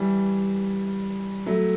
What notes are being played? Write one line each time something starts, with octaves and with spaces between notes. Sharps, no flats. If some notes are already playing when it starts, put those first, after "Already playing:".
Already playing: E3 G3
F#3 A3